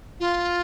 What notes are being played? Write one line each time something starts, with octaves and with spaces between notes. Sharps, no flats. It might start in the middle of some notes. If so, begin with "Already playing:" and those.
F4